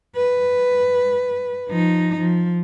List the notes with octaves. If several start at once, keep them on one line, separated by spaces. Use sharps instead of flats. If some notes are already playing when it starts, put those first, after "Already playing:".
B4
F3 D#4
F3